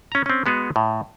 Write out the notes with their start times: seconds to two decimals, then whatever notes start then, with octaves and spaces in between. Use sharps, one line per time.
0.12 C#4 A#5
0.26 C4 C#4
0.46 G#3 B3 F#4 G#4
0.76 A2